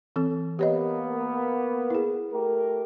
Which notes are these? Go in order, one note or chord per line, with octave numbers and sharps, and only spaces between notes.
E3 C4 A4
A#3 B3 G4 C#5 D#5
E4 G#4
A3 G4 A#4